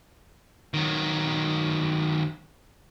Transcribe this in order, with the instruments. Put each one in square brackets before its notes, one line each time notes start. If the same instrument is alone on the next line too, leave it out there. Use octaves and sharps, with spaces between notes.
[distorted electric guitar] D#3 F#3